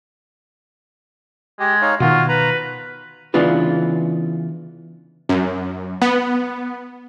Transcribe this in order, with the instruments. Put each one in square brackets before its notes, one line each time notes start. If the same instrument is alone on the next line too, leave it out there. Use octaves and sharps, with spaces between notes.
[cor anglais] G#3 [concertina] G4
[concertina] D#4 C#5 F5
[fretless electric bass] B2 D#3 [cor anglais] F4 [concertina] F#4
[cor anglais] B4 [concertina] A#5
[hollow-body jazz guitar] C#3 E3 B3 D4 F4 B4
[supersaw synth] F#2
B3